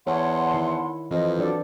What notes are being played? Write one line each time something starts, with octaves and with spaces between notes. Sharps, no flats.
E2 C#5 F#5 A5 C6
D#3 E4
F2 E3 C5 D#5
F#3 D4 F#4 A4 D5